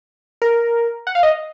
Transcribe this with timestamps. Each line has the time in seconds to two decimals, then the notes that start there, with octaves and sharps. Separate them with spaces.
0.42 A#4
1.07 F#5
1.15 F5
1.23 D#5